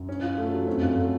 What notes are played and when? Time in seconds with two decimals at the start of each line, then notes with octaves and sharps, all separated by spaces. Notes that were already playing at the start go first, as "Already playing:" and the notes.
Already playing: F#2
0.09 C#4
0.22 F4
0.38 A3
0.53 F#3
0.67 F2 C#4
0.81 F#2 F4
0.97 A3